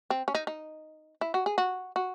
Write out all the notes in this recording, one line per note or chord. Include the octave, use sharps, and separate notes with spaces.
C4
C#4
D#4
D#4
E4
F#4
G#4
F#4
F#4